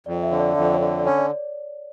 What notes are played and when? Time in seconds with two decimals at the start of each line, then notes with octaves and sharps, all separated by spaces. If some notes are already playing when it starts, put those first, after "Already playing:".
0.06 F2 D5
0.23 E5
0.31 D3 C#5
0.40 D5
0.56 F2 E5
0.65 D5
0.74 C#5
0.80 D3 D5
0.99 D5
1.05 C#4 C#5
1.18 D5